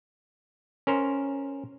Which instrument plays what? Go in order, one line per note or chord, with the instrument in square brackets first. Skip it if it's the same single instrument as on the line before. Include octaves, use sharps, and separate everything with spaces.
[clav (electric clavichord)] C#4 A#4 C5